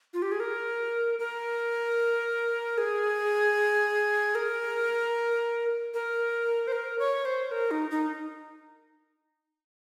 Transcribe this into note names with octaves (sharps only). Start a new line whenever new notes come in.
F4
G4
G#4
A#4
A#4
G#4
A#4
A#4
C5
A#4
C#5
C5
A#4
D#4
D#4